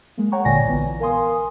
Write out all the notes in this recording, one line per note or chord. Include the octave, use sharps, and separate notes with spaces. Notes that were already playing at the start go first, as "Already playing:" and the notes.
G#3 A#3
C#5 F#5 G5 A#5 C#6
G1 A#2 D3 D5 G#5 A#6
A#1 E3 B3
A#4 F5 G#5 C6 D#6